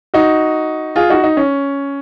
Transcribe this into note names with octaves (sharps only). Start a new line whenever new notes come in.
D#4 F#4
F4 G#4
D#4 F#4
D#4
C#4